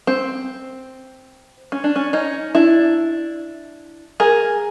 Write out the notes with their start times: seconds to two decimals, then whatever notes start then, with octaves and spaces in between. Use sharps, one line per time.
0.07 C4
1.72 C#4
1.84 D4
1.96 C#4
2.13 C#4 D#4
2.55 D4 E4
4.20 G#4 A#4